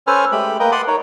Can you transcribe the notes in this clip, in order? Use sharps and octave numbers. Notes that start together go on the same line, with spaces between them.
C#4 A4 B4 C5 G#5 F6
G#3 A3 G4 B5
A#3 A#4 B4 D#5 G5
F#5 A5 B5 C6 D6 D#6
D#4 A#4 C#5